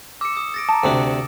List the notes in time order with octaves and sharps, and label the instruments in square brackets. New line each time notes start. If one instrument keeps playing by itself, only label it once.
[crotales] D6 [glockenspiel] E6 C#7
[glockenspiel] D#6
A6 A#6 D7
[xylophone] A5 A#5
[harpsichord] D2 C3 D4